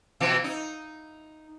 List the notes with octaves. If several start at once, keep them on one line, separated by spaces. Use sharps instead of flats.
B2 E3 F3
D#4